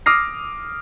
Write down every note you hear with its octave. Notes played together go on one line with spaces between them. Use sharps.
D6 D#6 F6 A#6 C7